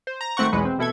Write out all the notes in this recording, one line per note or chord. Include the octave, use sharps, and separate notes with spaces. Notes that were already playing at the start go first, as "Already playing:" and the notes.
C5
A#5
G#1 A3 C4 F#5 C#6
B1 E2 B2 G#3 B4
C4
A1 B2 E4 A4 G#6